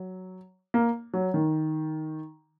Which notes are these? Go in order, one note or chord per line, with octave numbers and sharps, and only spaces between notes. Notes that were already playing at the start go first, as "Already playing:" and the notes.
Already playing: F#3
A#3
F#3
D#3